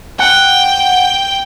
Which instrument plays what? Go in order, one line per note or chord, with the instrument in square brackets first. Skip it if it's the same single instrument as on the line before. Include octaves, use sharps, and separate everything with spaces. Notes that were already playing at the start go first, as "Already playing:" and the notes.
[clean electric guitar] F#5 [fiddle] G5